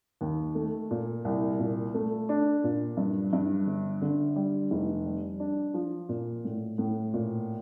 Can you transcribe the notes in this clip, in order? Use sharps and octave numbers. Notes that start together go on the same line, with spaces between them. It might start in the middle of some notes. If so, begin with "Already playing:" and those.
D#2
A3
A#2
C2
A#2
A3
D4
A#2
G2
G2
G1
D3
G3
F1
G3
D4
F3
A#2
A2
A2
A#2